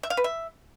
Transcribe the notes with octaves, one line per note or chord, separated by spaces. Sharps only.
E5
F5
B4
E5